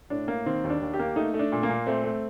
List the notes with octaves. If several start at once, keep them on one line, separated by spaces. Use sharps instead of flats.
A2 D4
A#3
D#3 C4
D#2
D4
D#2
G4
A#3
A3 D#4
A3
D4
A#2
A#3
A#2
A3 C4
A3